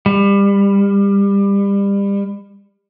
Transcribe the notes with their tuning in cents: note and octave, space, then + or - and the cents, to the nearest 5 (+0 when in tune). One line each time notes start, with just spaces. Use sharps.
G3 +25